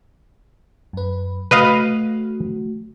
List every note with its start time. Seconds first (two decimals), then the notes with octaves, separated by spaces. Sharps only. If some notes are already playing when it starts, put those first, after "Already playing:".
0.93 F#2 B4
1.51 A3 F#4 B4 D#5 F5